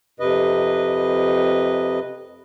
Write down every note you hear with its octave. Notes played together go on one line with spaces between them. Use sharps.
F2 C3 B4 D#5